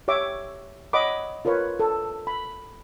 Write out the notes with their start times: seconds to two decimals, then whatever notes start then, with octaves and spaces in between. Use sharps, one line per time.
0.08 G4 C#5 E5 D6
0.93 C#5 D#5 F#5 B5 D6
1.45 F4 A#4 B4 C#5
1.80 A4
2.27 B5